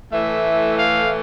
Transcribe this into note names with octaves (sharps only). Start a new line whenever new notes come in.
A2 E3 A3 E5
F5